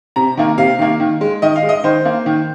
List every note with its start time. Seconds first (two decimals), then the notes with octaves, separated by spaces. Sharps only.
0.16 C3 A#5
0.37 D#3 A#3
0.58 C3 F5
0.79 D#3 A#3
1.00 D#3
1.21 G#3
1.42 D#3 D#5
1.56 F5
1.63 G#3
1.69 D#5
1.84 D#3 C5
2.05 A#3
2.26 D#3